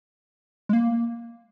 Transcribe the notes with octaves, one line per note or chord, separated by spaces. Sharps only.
G#3
A#3